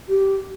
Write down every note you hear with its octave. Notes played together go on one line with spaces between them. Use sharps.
G4